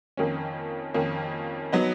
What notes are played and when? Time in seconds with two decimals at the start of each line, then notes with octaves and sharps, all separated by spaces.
0.17 F2 D#3 A#3 C#4
0.94 F2 D#3 A#3 C#4
1.72 F#3 B3 D#4